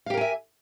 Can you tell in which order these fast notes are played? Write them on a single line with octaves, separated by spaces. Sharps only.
F5 G4 A#4 G#5 E5